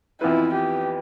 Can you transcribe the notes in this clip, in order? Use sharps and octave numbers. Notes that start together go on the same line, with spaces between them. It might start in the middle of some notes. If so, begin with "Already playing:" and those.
F2 E3 B3 E4 F4 B4
G4